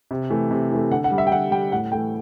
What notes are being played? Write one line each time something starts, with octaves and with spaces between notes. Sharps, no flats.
C3
E3 A3
C3
E3 A3
D3 F#5
F#5
G3
E5
G5
D3 F#5
G3 G5
A2 F#5
E3 A3 G5